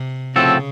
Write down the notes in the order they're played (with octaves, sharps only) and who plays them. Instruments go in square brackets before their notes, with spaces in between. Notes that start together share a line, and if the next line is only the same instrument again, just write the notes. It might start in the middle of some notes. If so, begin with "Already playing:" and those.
Already playing: [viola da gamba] C3
[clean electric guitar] A2 F3 C4 F#4 A4 [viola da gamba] C#3